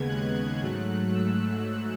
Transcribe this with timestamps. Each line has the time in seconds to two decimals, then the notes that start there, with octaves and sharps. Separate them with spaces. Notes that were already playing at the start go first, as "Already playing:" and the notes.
Already playing: D#2 C#3 G#3 B3 G#6
0.08 F#6
0.61 G#2 F#3 A3
1.14 E6